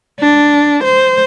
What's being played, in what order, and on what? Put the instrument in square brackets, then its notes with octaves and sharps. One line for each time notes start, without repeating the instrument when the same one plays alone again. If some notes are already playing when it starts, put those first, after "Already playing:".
[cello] D4
C5